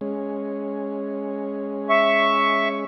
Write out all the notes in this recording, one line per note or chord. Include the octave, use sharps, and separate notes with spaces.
G#3 C#4
E5 C#6